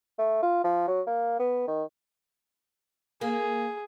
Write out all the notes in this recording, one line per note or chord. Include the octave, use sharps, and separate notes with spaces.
A3
F4
F3
F#3
A#3
B3
D#3
A#3 G#4